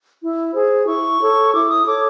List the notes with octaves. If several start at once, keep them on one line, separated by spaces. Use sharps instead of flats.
E4
G#4 C5
E4 C#6
A4 C#5
E4 D6
D#6
A4 C#5 D6